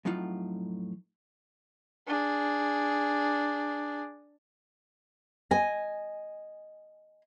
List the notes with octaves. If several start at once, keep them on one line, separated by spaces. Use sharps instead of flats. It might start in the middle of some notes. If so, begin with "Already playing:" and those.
F2 A2 F#3 D#4 F4 F#5
D4 G#4
D#5 G#5